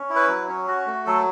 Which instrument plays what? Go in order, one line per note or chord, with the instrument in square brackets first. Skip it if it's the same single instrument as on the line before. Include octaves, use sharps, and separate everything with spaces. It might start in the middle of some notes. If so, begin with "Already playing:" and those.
Already playing: [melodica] C#4
E4
B4
F#3
C#4
F#4
A3
F#3 A4